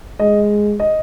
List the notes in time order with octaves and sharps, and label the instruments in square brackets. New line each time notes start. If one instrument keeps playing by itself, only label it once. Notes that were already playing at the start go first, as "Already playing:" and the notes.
[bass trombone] G#3 [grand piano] D#5
[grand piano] D#5